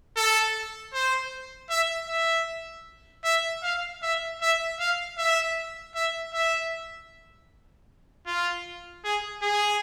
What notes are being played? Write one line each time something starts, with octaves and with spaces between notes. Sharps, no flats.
A4
C5
E5
E5
E5
F5
E5
E5
F5
E5
E5
E5
F4
G#4
G#4